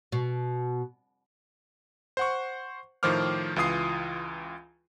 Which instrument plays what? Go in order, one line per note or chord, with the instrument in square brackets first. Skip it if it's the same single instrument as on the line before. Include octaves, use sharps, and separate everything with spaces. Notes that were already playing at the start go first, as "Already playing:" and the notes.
[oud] B2
[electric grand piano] C5 F#5 C#6
A2 D#3 F3 C5 D6 F6
C#2 E3 F4 D#6 C7